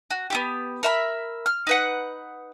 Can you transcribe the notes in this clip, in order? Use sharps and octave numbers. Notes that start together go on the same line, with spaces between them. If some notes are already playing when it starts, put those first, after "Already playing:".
F#4
B3 E4 G4
A#4 E5 B5
F6
D#4 B4 F#5